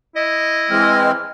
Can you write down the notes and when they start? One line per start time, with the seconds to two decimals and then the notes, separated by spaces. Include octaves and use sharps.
0.16 E4 D#5
0.70 E3 G#3 C4 F6